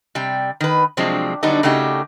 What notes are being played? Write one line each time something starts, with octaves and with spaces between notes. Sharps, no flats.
C3 G3 G5
D#3 B4
C3 F3 F#3 G#3 C4 D4
D3 F#3 G3 B3 D4 D#4
C#3 A3 D4 D#4 F#4 G4